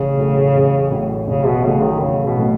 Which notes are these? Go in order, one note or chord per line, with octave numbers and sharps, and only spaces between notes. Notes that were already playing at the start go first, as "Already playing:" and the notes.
Already playing: A1 C#3
A2 F#3 A3 C#4
A1
A2 F#3 A3 C#4
A1 C#3
B2
A2 C#3 F#3 A3 C#4
D#3
A1 C#3
B2
A2 F#3 A3 C#4